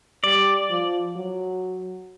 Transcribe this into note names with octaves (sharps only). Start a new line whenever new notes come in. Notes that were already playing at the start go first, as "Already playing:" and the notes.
G3 D5
F3
F#3